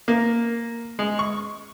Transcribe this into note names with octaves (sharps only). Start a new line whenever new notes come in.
A#3
G#3
C#6